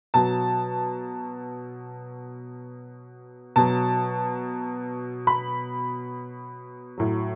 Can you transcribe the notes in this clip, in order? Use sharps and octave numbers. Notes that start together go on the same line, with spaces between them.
B2 F#3 A5
B2 F#3 A5
B5
A2 F#3